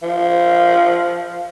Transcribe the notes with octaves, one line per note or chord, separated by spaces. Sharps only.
F3